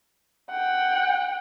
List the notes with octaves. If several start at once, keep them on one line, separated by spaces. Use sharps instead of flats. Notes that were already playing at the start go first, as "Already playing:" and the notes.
F#5 G5